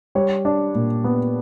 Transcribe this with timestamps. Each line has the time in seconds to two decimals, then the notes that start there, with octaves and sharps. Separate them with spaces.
0.15 G3 C#5
0.45 D4
0.75 A#2
1.04 B3